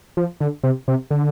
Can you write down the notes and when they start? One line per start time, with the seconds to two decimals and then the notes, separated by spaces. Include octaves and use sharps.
0.17 F3
0.41 D3
0.63 C3
0.88 C3
1.11 D3